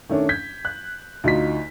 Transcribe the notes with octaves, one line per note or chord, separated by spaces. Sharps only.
D#3 A3 C#4 D4
G6 G#6 B6
F#6
D2 D#4 F4 B6